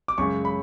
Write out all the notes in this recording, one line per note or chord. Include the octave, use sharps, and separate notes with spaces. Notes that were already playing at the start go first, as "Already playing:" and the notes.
D6
F#2 C#3 G#3 C#6
B5